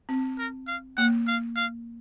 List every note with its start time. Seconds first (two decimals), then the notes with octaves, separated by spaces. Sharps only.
0.09 C4
0.38 A#4
0.68 F5
0.97 A#3 F#5
1.28 F5
1.57 F5